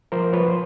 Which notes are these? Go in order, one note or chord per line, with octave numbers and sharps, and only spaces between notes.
F3 A#4 C5
F3 B4 C#5
C5